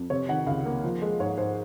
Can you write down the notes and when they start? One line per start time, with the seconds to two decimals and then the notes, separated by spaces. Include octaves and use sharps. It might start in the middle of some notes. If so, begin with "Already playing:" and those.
Already playing: F2
0.10 C3 C#5
0.29 D#3 F#5
0.47 C#2 F5
0.66 A#3
0.84 F3
1.02 G#3
1.20 G#2 C#5
1.38 G#2 C5